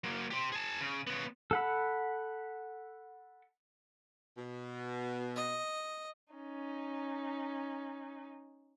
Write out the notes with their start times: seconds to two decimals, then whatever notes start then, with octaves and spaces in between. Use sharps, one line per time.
0.04 F#3 A#3
0.31 G4 C5
0.52 G#4 A5
0.81 C#3
1.07 C#3 B3
1.51 A4 F#5 B5
4.38 B2
5.36 D#5
6.34 C#4 D#4